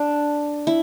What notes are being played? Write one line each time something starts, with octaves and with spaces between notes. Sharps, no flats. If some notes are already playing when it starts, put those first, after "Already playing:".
Already playing: D4
E4